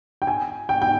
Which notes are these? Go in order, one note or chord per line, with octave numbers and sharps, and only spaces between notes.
G5
G#5
G5
G5